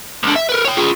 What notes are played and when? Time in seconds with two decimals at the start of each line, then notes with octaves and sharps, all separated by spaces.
0.23 C#2 D3
0.35 E5
0.49 A#4 B4
0.65 C#5 G5
0.77 F4 G#4